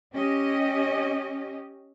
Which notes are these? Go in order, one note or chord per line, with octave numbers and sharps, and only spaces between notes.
C#4 G4 D#5